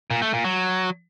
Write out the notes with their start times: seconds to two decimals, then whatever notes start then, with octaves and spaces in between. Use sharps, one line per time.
0.10 A#2
0.22 A3
0.33 A#2
0.44 F#3